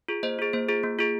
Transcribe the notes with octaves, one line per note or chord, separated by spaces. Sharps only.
F4 G#4
A#3 C5 D#5
F4 G#4
A#3 C5
F4 G#4
A#3
F4 G#4